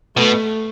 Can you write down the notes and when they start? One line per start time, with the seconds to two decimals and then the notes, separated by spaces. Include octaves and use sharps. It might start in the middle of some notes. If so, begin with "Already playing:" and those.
0.17 B2 A3